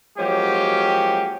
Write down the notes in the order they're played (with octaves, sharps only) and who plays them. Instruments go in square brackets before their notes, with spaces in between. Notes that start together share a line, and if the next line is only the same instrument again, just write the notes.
[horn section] F3 F#3 G#3 A#3 C#4 G4